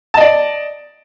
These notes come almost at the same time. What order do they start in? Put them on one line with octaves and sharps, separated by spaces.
A5 D#5 D5